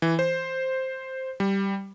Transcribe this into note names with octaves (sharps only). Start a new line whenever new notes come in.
E3
C5
G3